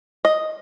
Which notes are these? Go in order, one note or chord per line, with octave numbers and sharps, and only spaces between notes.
D#5